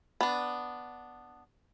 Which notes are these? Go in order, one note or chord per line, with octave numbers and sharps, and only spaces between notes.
B3 D4